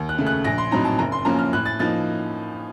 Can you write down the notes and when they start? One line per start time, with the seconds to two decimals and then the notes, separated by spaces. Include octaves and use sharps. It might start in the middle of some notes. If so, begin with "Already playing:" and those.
Already playing: D#2
0.09 F#6
0.18 C#3 A3
0.27 F#6
0.44 A#1 A#6
0.58 C6
0.71 A2 F#3 C4 D#4 A#5
0.85 A5
0.99 F#1 A#5
1.12 C6
1.25 F#2 F3 A#3 C#4 A#5
1.39 F6
1.53 A2 F#6
1.66 A6
1.79 F3 A#3 D#4 A6